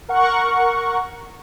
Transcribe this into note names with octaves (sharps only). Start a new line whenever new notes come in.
A#4 F#5 C#6